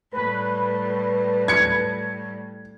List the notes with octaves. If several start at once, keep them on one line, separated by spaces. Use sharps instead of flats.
A2 G3 B4
G#6 C#7